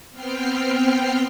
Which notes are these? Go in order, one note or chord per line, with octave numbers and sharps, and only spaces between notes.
B3 C4 G5 F6 C7